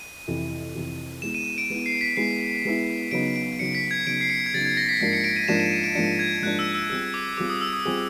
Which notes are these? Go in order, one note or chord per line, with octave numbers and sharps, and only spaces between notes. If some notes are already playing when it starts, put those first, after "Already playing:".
Already playing: D#7
F2 C3 E3
F2 C3 E3
G#3 B3 E4 E7
D#7
D#7
D7
G#3 B3 E4
C7
B6
G#3 B3 E4 C7
G#3 B3 E4
C#3 F#3 B3 D#4 D7
D7
C#3 F#3 B3 D#4 C#7
B6
G#6
C#3 F#3 B3 D#4 D7
C7
C#7
G#6
C#3 F#3 B3 D#4 A6
G#6
A#6
B6
G#2 F3 A#3 D4 C7
C#7
D7
D#7
G#2 F3 A#3 D4 E7
D#7
D#7
D7
G#2 F3 A#3 D4 C#7
G#6
G#2 F3 A#3 D4 F#6
E6
E6
G3 C4 F4 G#4 E6
D6
G3 C4 F4 G#4 D6
D#6
E6
D#6
G3 C4 F4 G#4